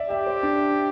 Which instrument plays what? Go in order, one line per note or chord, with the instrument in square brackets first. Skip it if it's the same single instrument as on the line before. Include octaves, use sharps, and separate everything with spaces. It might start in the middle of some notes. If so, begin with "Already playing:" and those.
Already playing: [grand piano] D5 E5
[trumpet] G4 [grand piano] E5
[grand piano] C5
D4